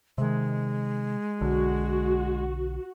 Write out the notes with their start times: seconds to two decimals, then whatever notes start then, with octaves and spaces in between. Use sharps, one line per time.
0.18 C3 D#3 G#3
1.41 B1 D3 F#4